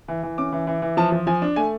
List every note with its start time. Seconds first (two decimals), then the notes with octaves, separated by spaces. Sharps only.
0.08 E3
0.23 E3
0.38 C#4 D6
0.53 E3
0.67 E3
0.82 E3
0.97 F3 A5
1.12 F3
1.27 F3 G#5
1.42 D4
1.56 A3 G#5